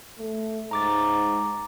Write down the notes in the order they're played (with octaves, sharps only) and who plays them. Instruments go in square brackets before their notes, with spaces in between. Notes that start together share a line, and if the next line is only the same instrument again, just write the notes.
[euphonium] A3
[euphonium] G#2 [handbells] A#5 D6 A6